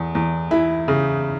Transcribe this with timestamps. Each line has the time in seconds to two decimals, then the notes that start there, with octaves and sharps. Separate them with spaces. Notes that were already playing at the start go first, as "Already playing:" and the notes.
Already playing: E2
0.15 E2
0.51 E3 E4
0.88 C#3